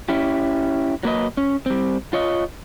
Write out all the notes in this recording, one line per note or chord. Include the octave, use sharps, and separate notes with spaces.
C#4 E4 G4
F#3 A#3 B4 D#5
C#4
G3 C4
F4 C#5 D#5